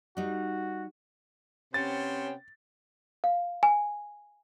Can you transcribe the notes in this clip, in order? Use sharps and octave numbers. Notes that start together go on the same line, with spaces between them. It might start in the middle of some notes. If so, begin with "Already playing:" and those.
G3 D#4 F#4
C3 B3 C#4 C5 G5 A6
F5
G#5